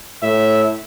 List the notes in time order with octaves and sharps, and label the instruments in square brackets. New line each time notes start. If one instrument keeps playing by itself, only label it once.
[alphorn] A2 [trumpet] E5